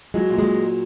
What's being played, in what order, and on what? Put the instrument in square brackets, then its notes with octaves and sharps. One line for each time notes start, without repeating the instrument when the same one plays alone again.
[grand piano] F#3 [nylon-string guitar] G#3
[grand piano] A#2
[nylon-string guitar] G#3